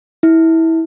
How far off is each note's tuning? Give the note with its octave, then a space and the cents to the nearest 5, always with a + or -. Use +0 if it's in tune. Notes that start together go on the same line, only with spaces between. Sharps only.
E4 -20